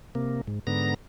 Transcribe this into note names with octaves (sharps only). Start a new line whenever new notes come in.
C3 A#3
G#2
G#2 D3 B3 A#5 A#6